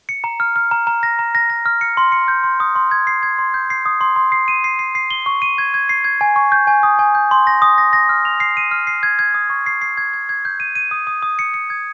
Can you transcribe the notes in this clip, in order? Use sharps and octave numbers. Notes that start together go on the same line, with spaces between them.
C#7
A#5
F6
F6
A#5
A#5
A#6
A#5
A#6
A#6
F6
C#7
C6
C#7
G6
C6
D#6
C6
G#6
C7
G#6
C6
G6
C7
D#6
C6
C6
C7
D#7
C7
C7
C7
G7
C#6
D#7
G#6
G#6
C7
G#6
G#5
C#6
G6
G#5
D#6
G#5
G6
C6
A#6
D#6
A#6
A#6
F6
F7
C7
D#7
F6
C7
G#6
G#6
D#6
C#6
C7
C7
G#6
G#6
G#6
G6
D#7
D#7
D#6
D#6
D#6
C#7
C#7
G#6